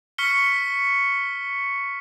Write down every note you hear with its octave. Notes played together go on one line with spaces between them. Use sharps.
C#6 F6 B6 C#7 G7